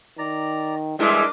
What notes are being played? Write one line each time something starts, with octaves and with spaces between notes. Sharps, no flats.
D#3 D5 A#5
E3 G3 G#3 D4 E4 A#4 D#5 D6